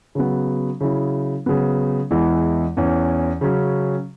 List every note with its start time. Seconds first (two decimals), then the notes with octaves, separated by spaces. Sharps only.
0.15 C#3 F#3 B3
0.80 C#3 F#3 E4
1.46 C#3 F#3 B3
2.11 E2 E3 G#3 E4
2.77 E2 E3 C#4
3.41 C#3 F#3 C#4